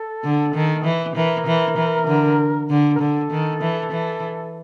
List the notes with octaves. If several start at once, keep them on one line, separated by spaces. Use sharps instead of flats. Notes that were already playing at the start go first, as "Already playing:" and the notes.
Already playing: A4
D3
D#3
E3
E3 A#4
E3
E3
D3
D3
A#4
D3 A4
D#3
E3
E3